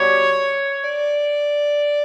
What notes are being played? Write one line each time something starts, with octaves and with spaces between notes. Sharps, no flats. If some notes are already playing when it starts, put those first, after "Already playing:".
Already playing: B2 G3 C#5
D5